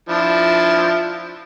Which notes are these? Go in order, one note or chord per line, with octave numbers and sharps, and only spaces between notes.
F3 D4 E4